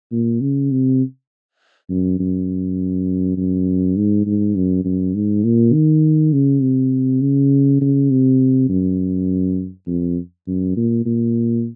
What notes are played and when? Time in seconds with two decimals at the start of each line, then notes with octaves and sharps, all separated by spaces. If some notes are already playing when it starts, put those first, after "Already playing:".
0.12 A#2
0.41 C#3
0.71 C3
1.90 F#2
2.19 F#2
3.37 F#2
3.96 G#2
4.26 G#2
4.55 F#2
4.85 F#2
5.15 G#2
5.44 A#2
5.73 D#3
6.33 C#3
6.62 C3
7.21 C#3
7.81 C#3
8.11 C3
8.69 F#2
9.87 F2
10.47 F#2
10.77 A#2
11.06 A#2